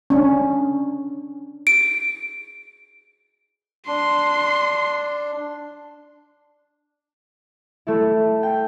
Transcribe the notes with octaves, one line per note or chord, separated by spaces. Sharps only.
C#4 D4
D7
D4 C6
A3 E4
G5